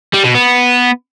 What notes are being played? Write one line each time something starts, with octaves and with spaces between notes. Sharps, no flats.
G3
B2
B3